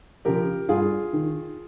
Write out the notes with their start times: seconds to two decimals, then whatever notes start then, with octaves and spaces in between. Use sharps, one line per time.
0.25 C#3 F3 G4 A#4
0.69 G2 F4 G#4
1.13 D#3